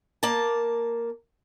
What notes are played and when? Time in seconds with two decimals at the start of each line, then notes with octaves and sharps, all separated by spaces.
0.23 A#3 A5